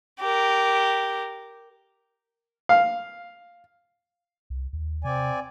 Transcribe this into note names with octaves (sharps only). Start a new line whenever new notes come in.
G4 A#4
F5
C2
D#2
C3 C4 D5 G#5